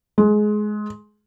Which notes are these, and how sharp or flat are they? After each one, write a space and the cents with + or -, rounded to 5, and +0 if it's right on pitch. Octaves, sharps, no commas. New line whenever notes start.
G#3 +20